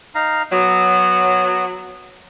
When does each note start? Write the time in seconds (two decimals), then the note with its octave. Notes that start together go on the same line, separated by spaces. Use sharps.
0.15 D#4 F5 A#5
0.51 F#3 B3